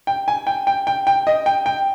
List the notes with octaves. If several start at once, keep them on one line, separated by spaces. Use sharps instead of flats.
G5
G#5
G5
G5
G5
G5
D#5
G5
G5